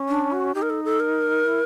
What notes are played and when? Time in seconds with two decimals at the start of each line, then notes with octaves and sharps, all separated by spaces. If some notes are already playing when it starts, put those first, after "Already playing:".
Already playing: C#4
0.09 D4
0.32 F#4
0.55 D#4 G4
0.62 A#4
0.70 A4
0.84 A4
1.00 A#4
1.44 E4